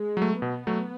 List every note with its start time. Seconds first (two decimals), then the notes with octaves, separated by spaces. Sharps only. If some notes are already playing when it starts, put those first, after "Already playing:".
Already playing: G#3
0.17 F#3 A3
0.42 B2 B3
0.67 F#3 A3